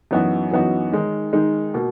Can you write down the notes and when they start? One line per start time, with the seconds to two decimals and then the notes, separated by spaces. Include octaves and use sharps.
0.11 F#2 E3 B3 D#4 F#4
0.51 F#2 E3 B3 D#4 F#4
0.92 D#3 G#3 D#4
1.33 D#3 G#3 D#4
1.74 B2 A#3